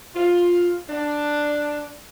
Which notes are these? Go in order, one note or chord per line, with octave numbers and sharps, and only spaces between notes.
F4
D4